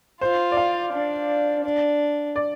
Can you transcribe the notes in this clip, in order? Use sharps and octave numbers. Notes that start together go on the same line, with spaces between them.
F4 C5
D5
F5
D4
D4
D5